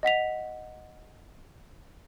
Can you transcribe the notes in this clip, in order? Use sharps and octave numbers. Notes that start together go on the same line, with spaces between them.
D#5 F#5 B6 F7